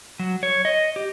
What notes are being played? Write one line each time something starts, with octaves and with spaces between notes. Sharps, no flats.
F#3
C#5
D#5
G4